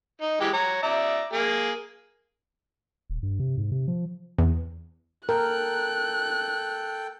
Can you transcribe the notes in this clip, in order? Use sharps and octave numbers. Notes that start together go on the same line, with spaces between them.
D#4
E3 G#3 G4
C#5 A#5
D5 E5 A#5
A#3 G#4
D#1
G2
C3
G#2
C3
F3
E2
A4 A#4 G5 F#6